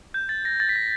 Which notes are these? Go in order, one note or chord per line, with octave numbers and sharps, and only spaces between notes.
G6
A6
A#6
A6
B6
A#6